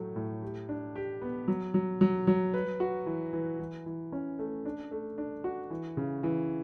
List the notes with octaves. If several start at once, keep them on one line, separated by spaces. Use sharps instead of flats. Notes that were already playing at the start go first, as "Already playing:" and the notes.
Already playing: A2 F#3 A3
A2
G4
D4
G4
B3
F#3
F#3
F#3
F#3
B4
F#4
E3
E3
E3
E3
C#4
A3
D4
A3
D4
F#4
E3
C#3
E3